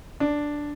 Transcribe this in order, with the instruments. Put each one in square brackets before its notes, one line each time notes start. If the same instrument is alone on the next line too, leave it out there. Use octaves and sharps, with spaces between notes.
[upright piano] D4